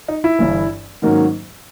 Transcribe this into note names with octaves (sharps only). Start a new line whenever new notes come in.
D#4
E4
G1 G2 E3
G#2 D#3 F#3 A#3 C#4